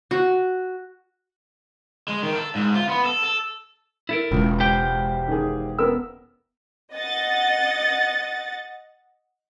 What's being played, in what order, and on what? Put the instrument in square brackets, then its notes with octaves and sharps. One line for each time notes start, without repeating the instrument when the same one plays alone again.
[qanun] F#4
[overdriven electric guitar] G#3
D#3
A4
G#2
F4
B3
A4
A4
[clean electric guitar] E4 A4 A#4
[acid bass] E1 [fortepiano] C#2
[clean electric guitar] G4 C5 G5
[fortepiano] D#3 G#4
B3 A#4 E6
[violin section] D#5 F#5 A6